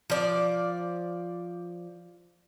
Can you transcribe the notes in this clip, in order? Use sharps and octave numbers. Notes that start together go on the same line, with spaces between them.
F3 D5